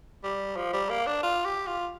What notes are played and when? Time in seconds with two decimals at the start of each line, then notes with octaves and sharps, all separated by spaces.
0.24 G3
0.56 F3
0.73 G3
0.90 A#3
1.06 D4
1.23 F4
1.45 G4
1.67 F4